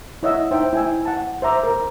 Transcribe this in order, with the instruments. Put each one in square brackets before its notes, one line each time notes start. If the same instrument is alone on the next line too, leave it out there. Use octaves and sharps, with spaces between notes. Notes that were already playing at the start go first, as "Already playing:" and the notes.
[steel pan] E4 C#5 D#5 E5 F#5 E6
D#4 C5 E5 G5
E4 G5 G#5 E6
F#5 A5
C5 E5 A#5 D6
A#4